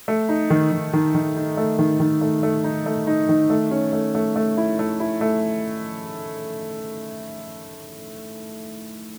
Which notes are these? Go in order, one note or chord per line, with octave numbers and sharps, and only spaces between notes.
A3
D#4
D#3
D#3
D#3
D#3
D#4
A3
D#3
D#3
A3
A3
D#4
A3
D#4
D#3
A3
C#4
A3
A3
A3
E4
A3
E4
A3